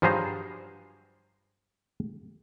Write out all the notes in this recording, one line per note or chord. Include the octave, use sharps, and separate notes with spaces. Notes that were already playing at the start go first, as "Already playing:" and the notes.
G2 F3 F#3 G#4 C5 A#5